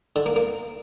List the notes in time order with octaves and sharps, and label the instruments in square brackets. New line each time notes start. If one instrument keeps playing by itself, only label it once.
[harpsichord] D3
A#3
A#3